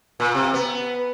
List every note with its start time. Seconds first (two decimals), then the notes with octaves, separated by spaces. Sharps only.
0.20 A#2
0.35 C3
0.54 B3